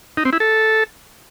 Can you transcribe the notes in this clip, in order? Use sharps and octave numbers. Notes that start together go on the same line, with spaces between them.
D#4
C4
E4
A4